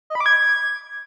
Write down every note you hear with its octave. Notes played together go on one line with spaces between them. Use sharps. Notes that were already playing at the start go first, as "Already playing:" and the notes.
D#5
B5
D6
G#6